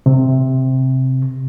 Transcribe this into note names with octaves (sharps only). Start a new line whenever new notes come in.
C3